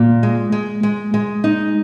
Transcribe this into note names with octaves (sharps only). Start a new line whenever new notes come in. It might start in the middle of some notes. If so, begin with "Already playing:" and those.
Already playing: A#2
G#3
G#3
G#3
G#3
D#4